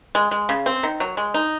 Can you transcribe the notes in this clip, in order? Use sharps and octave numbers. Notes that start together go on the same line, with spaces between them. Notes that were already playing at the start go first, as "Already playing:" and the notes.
G#3
G#3
C#3
C4
D#3
F#3
G#3
D#4